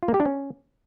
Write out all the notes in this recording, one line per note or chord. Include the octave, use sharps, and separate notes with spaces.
F4
A#3
G4
D4
C#4